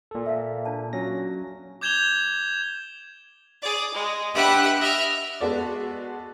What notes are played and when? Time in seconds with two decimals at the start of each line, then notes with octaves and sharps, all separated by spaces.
0.11 A#2 A4
0.26 E5 F5
0.65 D4 D5 A5
0.93 F#3 C#4 A#6
1.81 D6 G6 G#6 E7 F7 G7
3.62 G#4 D5
3.94 G#3
4.34 D4 G4 B4 E5 F#5 B5
4.78 D#5 E5 F6
5.41 G#3 B3 F#4 A4 D5